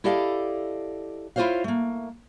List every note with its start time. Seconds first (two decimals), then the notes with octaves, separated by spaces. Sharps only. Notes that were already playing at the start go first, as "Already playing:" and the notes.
0.04 E4 G4 A4 D5 D#5 F5
1.36 E4 F4 A4 C5 C#5 F5
1.64 A3 A#3